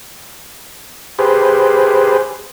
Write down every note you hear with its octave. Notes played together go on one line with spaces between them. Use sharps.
G4 G#4 B4 C5